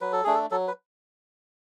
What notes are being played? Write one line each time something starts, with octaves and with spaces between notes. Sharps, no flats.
F#3 B4
A4
A3 D4 G#4
A4
F#3 A4
B4